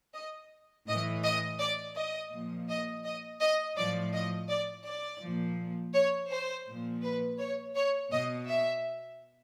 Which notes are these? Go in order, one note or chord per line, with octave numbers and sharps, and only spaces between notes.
D#5
A2 E3 D#5
D#5
D5
D#5
A#2 F3
D#5
D#5
D#5
A2 F3 D5
D#5
D5
D5
A#2 F3
C#5
C5
A#2 F3
B4
C#5
C#5
B2 D#5
E5